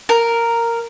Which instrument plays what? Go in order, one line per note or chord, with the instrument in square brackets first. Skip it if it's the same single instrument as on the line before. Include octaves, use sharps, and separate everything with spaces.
[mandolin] A#4